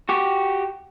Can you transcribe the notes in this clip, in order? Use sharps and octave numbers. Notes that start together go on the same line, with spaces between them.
F#4 G4